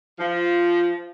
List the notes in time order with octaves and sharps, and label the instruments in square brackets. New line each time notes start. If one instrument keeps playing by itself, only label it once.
[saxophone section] F3